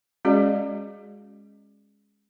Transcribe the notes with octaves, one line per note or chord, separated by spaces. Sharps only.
G#3 C#4 F#4 G#4 D5 D#5